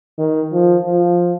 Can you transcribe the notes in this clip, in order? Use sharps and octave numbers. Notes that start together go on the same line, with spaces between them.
D#3
F3
F3